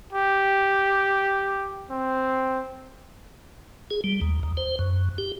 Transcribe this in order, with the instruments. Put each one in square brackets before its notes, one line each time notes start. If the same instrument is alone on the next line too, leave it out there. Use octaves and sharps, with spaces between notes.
[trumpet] G4
C4
[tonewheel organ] G#4
G3
D#2
D#2
C5
F#2
G4